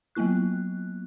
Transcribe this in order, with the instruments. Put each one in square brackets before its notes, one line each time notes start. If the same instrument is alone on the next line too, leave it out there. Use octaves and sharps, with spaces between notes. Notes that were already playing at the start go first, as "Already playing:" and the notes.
[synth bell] F#3 A#3 B3 E4 F#6